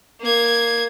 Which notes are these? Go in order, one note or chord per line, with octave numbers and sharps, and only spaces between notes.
A#3 G#6